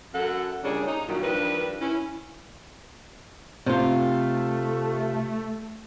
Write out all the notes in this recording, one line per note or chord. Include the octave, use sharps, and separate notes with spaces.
F#2 A4 F#5
A#2 C#3 G3 C#4 D4 G#4
D#4
G2 A#2 D#3 F#3
G2 D#3 F3 D4 B4
C#4 E4
C3 A3 F4